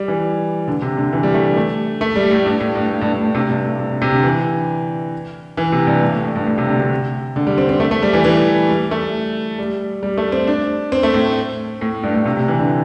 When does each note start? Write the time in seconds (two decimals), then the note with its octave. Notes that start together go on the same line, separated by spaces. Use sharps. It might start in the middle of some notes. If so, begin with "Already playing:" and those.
Already playing: G3
0.08 E3
0.68 D3
0.82 C3
0.97 D3
1.13 E3
1.23 G3
1.34 A3
1.56 A3
2.01 A3
2.16 G3
2.31 A2
2.46 G2
2.60 A2
2.75 G2
2.90 A2
3.01 G2
3.13 G2
3.23 A2
3.35 C3
3.50 G2
3.64 A2
3.79 C3
4.02 C3
4.12 D3
4.23 E3
5.57 E3
5.72 C3
5.87 G2
6.02 G2
6.13 A2
6.24 A2
6.35 G2
6.46 A2
6.58 C3
6.69 D3
6.80 C3
7.36 D3
7.47 G3
7.58 C4
7.69 C4
7.80 A3
7.91 A3
8.02 G3
8.13 E3
8.25 E3
8.69 G3
8.91 A3
9.59 G3
10.03 G3
10.18 A3
10.32 C4
10.47 D4
10.92 C4
11.03 A3
11.14 A2
11.81 A2
12.03 G2
12.14 A2
12.25 C3
12.37 C3
12.48 E3
12.59 D3